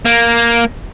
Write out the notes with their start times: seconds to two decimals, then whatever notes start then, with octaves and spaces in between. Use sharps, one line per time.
0.05 A#3